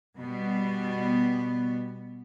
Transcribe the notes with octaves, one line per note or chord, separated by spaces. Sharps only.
B2 G3 B3